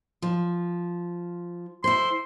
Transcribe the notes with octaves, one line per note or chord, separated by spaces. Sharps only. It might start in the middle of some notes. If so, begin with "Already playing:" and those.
F3
E4 C5 C6